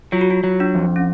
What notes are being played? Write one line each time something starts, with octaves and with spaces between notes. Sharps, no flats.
F#3 F4
F#4
F4
F#3
D4
F2
C#4